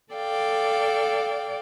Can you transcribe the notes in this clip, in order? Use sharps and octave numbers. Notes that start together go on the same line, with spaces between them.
A4 D5 F5 G5